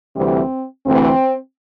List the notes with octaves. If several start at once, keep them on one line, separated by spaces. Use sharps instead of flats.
D2 C3 E3 G3 C4
D2 C3 E3 A3 C4